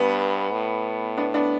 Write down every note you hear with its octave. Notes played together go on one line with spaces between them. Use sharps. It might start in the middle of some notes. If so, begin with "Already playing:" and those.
Already playing: G2 B3
A2
B3 D4
B3 D4